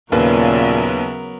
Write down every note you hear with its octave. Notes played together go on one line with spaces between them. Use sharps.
D#2 A#2 C#3 F#3 B3 A#4 B4 E5